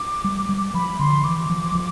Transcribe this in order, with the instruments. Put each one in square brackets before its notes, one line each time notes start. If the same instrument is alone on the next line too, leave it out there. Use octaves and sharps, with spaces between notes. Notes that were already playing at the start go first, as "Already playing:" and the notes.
Already playing: [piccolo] D6
[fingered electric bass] G3
G3
[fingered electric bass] F3 [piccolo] B5
[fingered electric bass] D3 [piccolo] C6
[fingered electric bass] E3 [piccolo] D6
[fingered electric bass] F3
F3